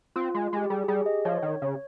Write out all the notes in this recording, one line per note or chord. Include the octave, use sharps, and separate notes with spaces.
C4 F4
G#3
G#3 G4
G4
G3 G#4
G4
G3 G#4
D#5
F3 C#5
D#3
C#3